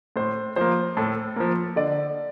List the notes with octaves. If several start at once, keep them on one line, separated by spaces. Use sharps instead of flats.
A2 C5
F3 A#3 C5
A2 A4
F3 A#3
D3 D5